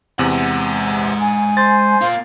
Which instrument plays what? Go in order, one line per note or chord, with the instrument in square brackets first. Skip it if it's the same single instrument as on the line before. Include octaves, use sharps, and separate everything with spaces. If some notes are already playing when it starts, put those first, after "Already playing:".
[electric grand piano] E2 C3 [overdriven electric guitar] G#3 F#5
[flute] G#5
[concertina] C5 [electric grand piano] A6
[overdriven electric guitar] A#3 F4 [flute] F5